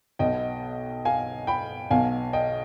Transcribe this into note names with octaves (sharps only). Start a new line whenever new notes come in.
B1 B2 D#5 G5
F5 G#5
G5 B5
B1 B2 F5 G#5
D#5 G5